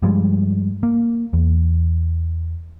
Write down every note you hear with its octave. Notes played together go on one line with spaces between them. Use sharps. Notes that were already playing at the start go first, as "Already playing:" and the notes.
G2 F3 G3 G#3
A#3
E2